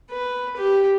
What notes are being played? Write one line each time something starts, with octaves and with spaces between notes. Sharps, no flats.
B4
G4